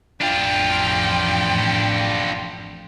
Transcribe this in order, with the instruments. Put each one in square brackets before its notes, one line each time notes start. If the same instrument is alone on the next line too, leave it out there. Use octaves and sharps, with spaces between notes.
[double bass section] A1 F2 [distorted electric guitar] D4 F4 [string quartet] G5